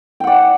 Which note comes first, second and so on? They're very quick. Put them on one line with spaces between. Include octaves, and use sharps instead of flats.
G5 F#5 D5